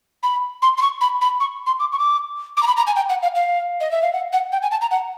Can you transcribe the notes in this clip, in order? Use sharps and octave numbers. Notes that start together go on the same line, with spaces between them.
B5
C6
C6
C#6
B5
B5
C#6
C6
D6
C#6
D6
D6
A#5
B5
A#5
G#5
G5
F#5
F5
F5
D#5
E5
F5
F#5
F#5
G5
G#5
A5
A#5
F#5